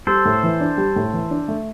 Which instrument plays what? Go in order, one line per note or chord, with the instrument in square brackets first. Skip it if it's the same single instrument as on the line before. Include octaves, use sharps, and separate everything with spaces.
[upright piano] G3 [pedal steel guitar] A4 C5
[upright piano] A2
E3
D4
G3
A2
E3
D4
A3